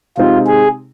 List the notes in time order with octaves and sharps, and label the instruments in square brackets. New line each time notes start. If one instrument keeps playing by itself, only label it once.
[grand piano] C3 G#3 C4 D#4 [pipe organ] F4
[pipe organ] G#4